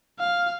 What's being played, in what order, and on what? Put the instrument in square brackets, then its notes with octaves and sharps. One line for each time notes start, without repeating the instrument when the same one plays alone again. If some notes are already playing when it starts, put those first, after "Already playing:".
[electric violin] F5